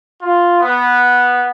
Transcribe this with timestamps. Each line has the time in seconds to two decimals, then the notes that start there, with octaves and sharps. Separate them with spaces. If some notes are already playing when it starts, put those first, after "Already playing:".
0.22 F4
0.61 B3